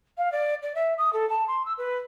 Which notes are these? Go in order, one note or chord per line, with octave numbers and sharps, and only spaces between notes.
F5
D5
D5
E5
D#6
A4
A5
C6
E6
B4